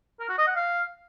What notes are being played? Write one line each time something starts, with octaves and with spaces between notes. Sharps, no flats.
A#4
F#4
D#5
F#5
F5